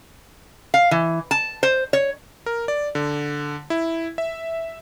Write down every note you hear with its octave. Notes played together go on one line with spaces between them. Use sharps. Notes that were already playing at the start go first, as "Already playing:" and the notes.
F5
E3
A5
C5
C#5
A#4
D5
D3
E4
E5